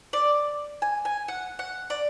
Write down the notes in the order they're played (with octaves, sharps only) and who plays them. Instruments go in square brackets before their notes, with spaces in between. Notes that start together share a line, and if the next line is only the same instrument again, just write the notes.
[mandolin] D5
G#5
G#5
F#5
F#5
D5